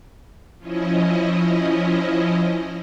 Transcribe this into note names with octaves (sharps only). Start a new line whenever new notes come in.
F3 C#4 E4 D#5